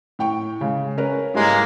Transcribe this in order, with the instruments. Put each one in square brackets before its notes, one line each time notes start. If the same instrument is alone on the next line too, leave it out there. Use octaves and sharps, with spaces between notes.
[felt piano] A2 G5 C#6
C#3 G#3
C#4 A#4 B4
[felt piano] G#2 G3 E4 [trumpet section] G#3 A#3